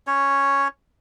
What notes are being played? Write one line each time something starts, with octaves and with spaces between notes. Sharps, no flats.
C#4 C#5